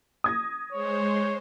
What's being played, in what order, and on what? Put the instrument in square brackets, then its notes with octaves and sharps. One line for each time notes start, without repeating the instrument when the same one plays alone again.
[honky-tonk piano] D#6 G#6 A#6
[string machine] G#3 C5 [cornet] C#5